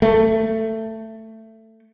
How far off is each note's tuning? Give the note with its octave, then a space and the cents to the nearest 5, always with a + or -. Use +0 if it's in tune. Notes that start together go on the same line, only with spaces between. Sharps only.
A3 +15